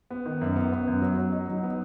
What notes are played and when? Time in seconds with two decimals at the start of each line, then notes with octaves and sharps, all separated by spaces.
0.10 B3
0.26 D#3
0.41 F#2
0.56 B3
0.72 B3
0.87 F#2
1.02 F#3
1.18 F#3
1.32 D#4
1.48 F#3
1.63 B3